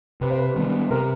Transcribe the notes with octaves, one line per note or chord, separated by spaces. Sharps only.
C3 B4
C5
B4
D#3 G3 B3
C3 A#4